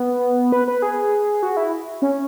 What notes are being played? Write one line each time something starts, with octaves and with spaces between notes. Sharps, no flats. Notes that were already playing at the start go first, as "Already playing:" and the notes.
Already playing: B3
B4
B4
G#4
F#4
E4
C#4